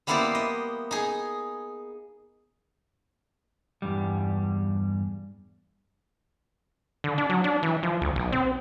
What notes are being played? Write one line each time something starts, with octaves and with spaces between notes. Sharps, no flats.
G3 A#3 B3 E4 C5 D5
D#5
D#4 G#4
E2 G2 G3
D3
D4
F#3
D4
E3
F3
D2
B1
C4